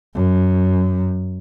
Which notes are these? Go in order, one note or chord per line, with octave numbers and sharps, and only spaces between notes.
F#2